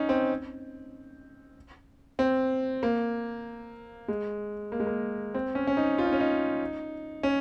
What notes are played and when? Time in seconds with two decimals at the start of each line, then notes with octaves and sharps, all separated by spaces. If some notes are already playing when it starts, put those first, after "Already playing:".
Already playing: C#4 D#4
0.09 C4
2.19 C4
2.83 A#3
4.08 G#3
4.72 A#3
4.80 G#3
4.87 A#3
5.34 C4
5.55 C#4
5.67 C#4
5.77 D#4
5.98 F4
6.06 D#4
6.13 C#4
6.20 D#4
7.23 C#4